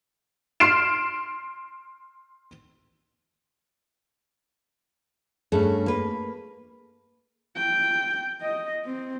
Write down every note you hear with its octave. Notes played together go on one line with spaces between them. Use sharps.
C6 F6 C7 D7 E7
G2 A3 C#4 G#4
A#3 B4
G5
D#5
C4